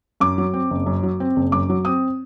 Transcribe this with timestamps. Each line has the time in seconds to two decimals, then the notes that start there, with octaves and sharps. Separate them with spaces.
0.20 F#2 D6
0.38 F#3
0.54 C4
0.70 F#1
0.86 F#2
1.03 F#3
1.20 C4
1.36 F#1
1.52 F#2 D6
1.69 F#3
1.85 C4 D#6